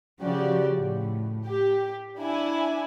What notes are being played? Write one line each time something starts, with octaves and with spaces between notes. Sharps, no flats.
C#3 F3 F#4 G4 D5
A2
G4
D4 E4 G#5